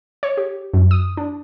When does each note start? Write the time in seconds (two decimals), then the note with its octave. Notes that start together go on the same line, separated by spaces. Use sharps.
0.23 C#5
0.37 G4
0.74 F#2
0.91 D#6
1.17 D4